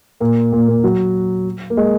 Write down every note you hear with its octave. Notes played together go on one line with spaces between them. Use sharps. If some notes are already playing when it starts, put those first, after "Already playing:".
A#2 A#3
A#2 A#3
A#2 A#3
F#3
A#3
G#3